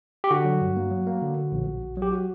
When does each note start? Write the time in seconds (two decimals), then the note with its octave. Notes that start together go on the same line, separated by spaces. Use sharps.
0.24 G4
0.31 D3 F#4
0.45 F#3
0.61 G2
0.76 A#3
0.91 F#3
1.07 A#3
1.22 D3
1.37 D3
1.52 A#1
1.67 A#1
1.83 A#1
1.97 F#3 G4
2.12 F#4